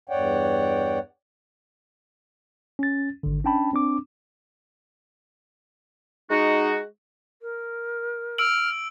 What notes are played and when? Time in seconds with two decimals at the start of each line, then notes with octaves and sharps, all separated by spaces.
0.09 E2 G2 C#5 D5 F#5 G5
2.79 C#4 A6
3.23 G#1 D3
3.44 C#4 D4 G5 A5 B5
3.73 C4 D4 D6
6.30 G#3 D#4 F#4
7.42 A#4
8.38 E6 F6 D7 F#7